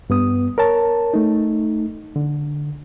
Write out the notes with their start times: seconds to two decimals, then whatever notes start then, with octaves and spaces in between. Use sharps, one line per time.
0.10 G2 B3 D#6
0.58 A#4 C#5 A5
1.14 A3 D#4
2.16 D3